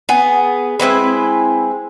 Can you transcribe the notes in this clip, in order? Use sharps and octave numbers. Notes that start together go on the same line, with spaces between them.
B3 G#4
G#3 C4 E4 B4